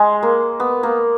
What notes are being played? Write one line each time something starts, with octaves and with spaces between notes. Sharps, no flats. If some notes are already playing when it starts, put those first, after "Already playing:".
Already playing: G#3
A#3
B3
A#3